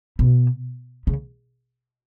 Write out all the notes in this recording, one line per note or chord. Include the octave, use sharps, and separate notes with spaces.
B2
C#3